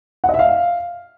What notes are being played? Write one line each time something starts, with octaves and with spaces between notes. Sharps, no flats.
F#5
D#5
E5
F5